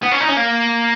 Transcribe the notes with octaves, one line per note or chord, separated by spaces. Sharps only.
B3
C#4
D#4
C#4
A#3